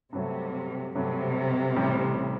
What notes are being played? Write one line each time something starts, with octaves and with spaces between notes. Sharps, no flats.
G2 C3 F#3 A3
G2 C3 F#3 A3
A1 A2 G3 C4